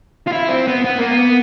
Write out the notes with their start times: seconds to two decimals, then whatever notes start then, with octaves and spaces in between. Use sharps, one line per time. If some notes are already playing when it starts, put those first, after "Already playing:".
0.27 F4
0.33 E4
0.49 C4
0.67 B3
0.85 B3
0.98 A#3
1.12 B3